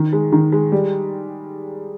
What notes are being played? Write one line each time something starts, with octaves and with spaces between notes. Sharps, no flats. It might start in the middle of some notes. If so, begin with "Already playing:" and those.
Already playing: D#3
G#3
D#3
G#3
G3